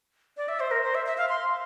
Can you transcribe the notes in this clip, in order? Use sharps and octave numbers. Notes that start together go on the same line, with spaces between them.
D5
E5
C5
A#4
C5
E5
E5
F5
C6